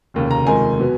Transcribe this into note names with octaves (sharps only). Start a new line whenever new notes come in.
F1 D#2 C#3
A#5
F1 F2 D#3 G#3 G#5
B2 F#3 B3